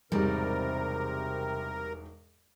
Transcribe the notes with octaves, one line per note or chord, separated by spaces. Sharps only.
E1 G#2 C3 G3 G#3 A#4